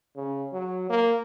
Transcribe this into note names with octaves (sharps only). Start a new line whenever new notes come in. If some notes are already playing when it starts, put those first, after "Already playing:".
C#3
F#3
A#3